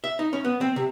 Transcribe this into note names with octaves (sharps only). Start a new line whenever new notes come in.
E5
D#4
C#4
B3
C4
C3